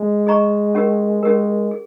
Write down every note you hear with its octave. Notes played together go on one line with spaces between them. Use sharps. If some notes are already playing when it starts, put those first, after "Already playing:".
Already playing: G#3
G#4 D#5 A#5 C#6
C#4 G4 A#4
G#3 C#4 G4 A#4
G#4